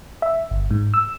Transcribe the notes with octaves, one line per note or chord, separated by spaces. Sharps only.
E5
G1
G#2
E6